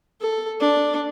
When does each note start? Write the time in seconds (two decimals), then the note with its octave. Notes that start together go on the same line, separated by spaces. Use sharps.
0.21 A4
0.60 D4